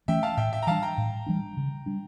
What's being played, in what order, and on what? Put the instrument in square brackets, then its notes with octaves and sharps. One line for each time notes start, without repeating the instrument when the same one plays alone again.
[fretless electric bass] E3 A3 C#4 [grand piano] E5 G5
[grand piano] F5 A5
[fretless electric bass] A2 [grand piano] E5 G5
[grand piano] E5 G5
A#5
[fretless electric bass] E3 G3 D4 [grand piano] F5 A5
[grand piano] G5 A#5
[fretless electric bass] A2
E3 G3 D4
C#3
G3 D4